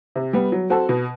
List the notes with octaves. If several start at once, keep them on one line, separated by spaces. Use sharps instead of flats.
C3
G3 B3
F#3
C4 F#4 A4
B2